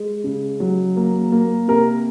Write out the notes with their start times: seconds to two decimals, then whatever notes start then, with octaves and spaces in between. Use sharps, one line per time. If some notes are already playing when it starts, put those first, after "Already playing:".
Already playing: G#3
0.24 C#3
0.60 F#3
0.96 A#3
1.32 A#3
1.68 C3 A#4